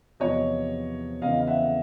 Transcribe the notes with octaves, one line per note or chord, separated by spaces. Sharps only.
E2 C3 F3 C#5 D#5
E2 C#3 E3 D#5 F5
F5
E5 F#5